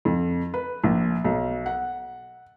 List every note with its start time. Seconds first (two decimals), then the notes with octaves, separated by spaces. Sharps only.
0.05 F2
0.54 B4
0.84 A#1
1.25 B1
1.66 F#5